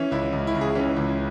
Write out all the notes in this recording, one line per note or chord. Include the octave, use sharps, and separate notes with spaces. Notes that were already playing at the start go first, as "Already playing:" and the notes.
Already playing: E3 C#4
C#2 E4
C#2
E4
C#3
G#4
E3 C#4
C#2